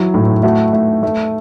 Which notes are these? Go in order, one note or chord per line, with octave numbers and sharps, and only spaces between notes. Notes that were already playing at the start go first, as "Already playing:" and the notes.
Already playing: E3 F#3 E4
A2
A3 F#4
A3
A3